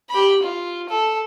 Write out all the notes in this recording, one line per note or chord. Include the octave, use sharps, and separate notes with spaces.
G4 B5
F4
A4